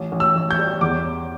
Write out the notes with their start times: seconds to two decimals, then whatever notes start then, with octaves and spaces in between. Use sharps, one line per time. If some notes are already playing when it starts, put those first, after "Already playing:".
Already playing: A1
0.12 A1
0.20 E6
0.36 A1
0.51 G6
0.58 G3
0.81 E2 D6